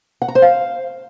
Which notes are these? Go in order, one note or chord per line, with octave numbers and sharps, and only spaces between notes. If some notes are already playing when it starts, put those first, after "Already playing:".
F#5
A#5
C5
F5